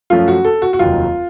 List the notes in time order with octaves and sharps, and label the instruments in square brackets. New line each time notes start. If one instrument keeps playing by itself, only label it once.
[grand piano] F#2 F3 A3 C#4 [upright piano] F4
[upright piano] F#4
A4
F#4
F#4
[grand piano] F1 D#2 D#3 F#3 [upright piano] F4